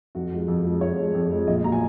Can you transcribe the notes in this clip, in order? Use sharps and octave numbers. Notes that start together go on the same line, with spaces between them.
F2 F#4
F3 G#3
F2
F3 G#3
F2 C#5
F3 G#3
F2
F3 G#3
A#1 D#5
A#2 F#3 A#5
G#5